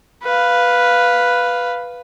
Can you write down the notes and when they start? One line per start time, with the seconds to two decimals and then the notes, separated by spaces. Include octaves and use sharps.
0.23 B4 F5